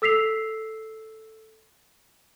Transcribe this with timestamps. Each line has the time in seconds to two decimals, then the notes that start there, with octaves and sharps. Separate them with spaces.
0.02 A4 E6 B6 C7 F7